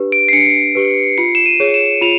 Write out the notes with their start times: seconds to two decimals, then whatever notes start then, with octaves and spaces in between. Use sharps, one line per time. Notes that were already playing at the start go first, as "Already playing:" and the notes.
Already playing: D4 G4 B4
0.12 D7
0.29 C7
0.33 D4 C#7
0.75 G4 B4
1.18 F4 C#7
1.35 E7
1.46 D#7
1.60 G#4 C#5
1.74 E7
2.01 F4 F7